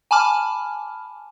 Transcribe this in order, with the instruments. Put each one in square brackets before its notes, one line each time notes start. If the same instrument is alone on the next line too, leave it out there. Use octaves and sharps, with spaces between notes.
[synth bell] G#5 A5 B5 D6 F6